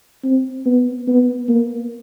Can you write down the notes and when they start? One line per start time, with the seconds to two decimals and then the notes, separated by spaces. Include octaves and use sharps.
0.24 C4
0.66 B3
1.07 B3
1.48 A#3